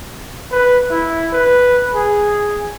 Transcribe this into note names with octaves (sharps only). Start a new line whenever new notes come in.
B4
E4
B4
G#4